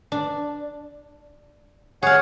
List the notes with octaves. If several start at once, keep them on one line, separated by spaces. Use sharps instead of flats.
D4
G#4 C#5 F5 F#5